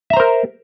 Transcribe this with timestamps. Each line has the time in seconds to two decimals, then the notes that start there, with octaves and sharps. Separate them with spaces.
0.10 E5
0.13 A#5
0.17 C5
0.20 A#4